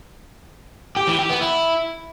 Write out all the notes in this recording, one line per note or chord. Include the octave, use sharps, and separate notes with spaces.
G4
E3
G4
B3
E4